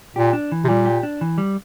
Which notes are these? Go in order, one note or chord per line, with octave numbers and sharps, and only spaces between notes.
A#2 G4
D4
E3
C3
A#2 G3
G4
D4
E3
G3